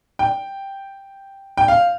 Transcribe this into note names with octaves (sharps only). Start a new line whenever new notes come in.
G5
G5
F5